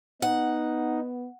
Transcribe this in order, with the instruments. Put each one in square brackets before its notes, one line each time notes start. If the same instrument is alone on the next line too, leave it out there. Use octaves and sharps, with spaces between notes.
[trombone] B3 [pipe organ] D#4 [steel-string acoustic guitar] F#5